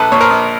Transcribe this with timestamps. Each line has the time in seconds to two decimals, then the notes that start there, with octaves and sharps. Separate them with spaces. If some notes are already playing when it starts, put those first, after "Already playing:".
Already playing: A#1 A4 B4
0.12 A#2 C#5
0.21 A#4 C5
0.30 A#1